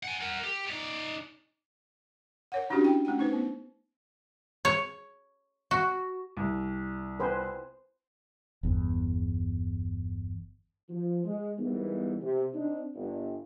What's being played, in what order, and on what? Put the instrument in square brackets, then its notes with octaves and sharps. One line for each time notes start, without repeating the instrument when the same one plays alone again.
[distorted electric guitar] F#5 G#5
A#4 F#5
G4
D#4 D5
[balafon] A#4 C#5 F#5
C#4 D4 E4 F#4 G4
G5
A3 C#4 G5
D#4 B4 C5
B3
[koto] C#5
F#4
[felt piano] C2
[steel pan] B4 C5 G#5
[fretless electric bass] G1 E2
[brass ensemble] F3
G#3
E2 G#2 E3 G3 A#3 B3
C3
C4 D4 D#4
G1